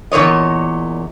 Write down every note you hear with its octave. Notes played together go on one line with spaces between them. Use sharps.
E2 A#2 C#3 C#5 D#5